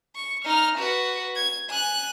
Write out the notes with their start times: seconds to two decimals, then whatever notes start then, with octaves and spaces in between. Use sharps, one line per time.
0.16 C#6
0.45 D#4 F6
0.78 F#4 B4
1.36 G#6
1.70 G#5 F#6